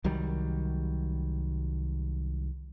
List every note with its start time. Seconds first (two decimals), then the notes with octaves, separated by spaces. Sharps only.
0.04 C2 D#3 F#3 G3